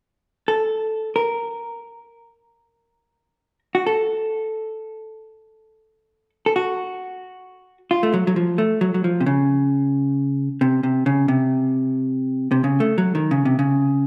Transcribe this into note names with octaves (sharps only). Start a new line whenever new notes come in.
A4
A#4
F#4
A4
A4
F#4
F4
A3
F#3
F#3
F3
A3
F#3
F#3
F3
C3
C#3
C3
C3
C#3
C3
C3
C#3
A3
F#3
D#3
C#3
C3
C#3